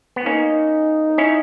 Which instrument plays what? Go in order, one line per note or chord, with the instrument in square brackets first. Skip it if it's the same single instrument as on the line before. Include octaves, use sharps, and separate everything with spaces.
[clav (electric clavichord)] B3
[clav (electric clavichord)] A#3 C#4 [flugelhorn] D#4
[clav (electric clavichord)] C#4 E4